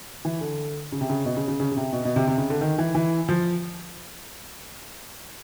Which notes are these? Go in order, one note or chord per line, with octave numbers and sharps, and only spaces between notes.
E3
D3
C#3
C3
C#3
B2
C#3
C#3
C#3
C#3
C3
B2
B2
C3
C3
C#3
D3
D#3
E3
E3
F3